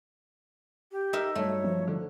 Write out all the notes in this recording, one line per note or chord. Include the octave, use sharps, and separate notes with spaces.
G4
D#4 A#4 E5
G2 F#3 A3 C#5
F3
D3